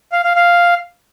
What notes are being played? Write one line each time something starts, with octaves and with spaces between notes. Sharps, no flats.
F5
F5
F5